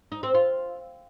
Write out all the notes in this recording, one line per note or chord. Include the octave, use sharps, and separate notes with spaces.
D#4
C4
F4